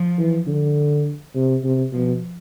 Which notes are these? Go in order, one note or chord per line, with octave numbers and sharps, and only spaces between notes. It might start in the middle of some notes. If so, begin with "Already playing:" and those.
Already playing: F3
E3
D3
C3
C3
B2 F3